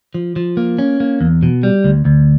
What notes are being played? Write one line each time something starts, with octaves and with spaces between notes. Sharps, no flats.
F3
F3
A#3
C#4
A#3
E2
B2
G3
D2
D2